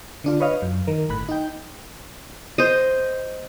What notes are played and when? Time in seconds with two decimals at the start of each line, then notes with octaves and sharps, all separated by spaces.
0.24 D3 D4 F4
0.40 B4 C#5 D#5 F5
0.62 F#2
0.87 D#3 A#4
1.09 G1 A2 B5 F#6
1.29 D#4 G5
2.58 C5 D#5